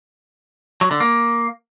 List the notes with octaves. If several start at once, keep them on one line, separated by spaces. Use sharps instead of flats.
F#3
D3
A#3